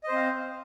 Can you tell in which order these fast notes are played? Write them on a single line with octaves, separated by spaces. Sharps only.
D#5 C5 C4 F5